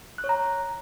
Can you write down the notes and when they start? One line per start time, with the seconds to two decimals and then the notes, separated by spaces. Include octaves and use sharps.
0.18 F#6
0.24 C#5
0.29 A#5